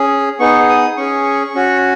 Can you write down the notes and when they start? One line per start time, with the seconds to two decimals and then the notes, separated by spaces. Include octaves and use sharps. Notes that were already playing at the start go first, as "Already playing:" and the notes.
Already playing: C#4 G#4
0.40 B3 D#4 G#4 C#6
0.69 D#6
0.97 C#4 G#4 C#6
1.55 C#4 F#4